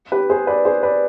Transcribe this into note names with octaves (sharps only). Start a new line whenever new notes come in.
G4 B4
G#4 C5
B4 D5
G#4 C5
B4 D5